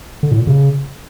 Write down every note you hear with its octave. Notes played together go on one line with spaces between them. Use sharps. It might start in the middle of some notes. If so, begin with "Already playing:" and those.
D3
A2
A#2
C#3